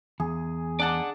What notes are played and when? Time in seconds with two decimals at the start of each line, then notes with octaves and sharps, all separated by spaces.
0.20 E2 G#4
0.80 D4 D5 F#5 A5